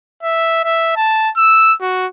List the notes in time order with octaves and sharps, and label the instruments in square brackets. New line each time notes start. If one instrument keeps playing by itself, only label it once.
[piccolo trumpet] E5
E5
A5
E6
F#4